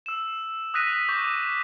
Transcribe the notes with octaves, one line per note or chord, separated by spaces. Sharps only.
E6 E7
D#6 E6 F#6 A#6 B6 D#7
C#6 D6 G6